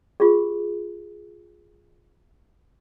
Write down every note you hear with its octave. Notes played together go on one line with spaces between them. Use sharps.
F4 G4 G#4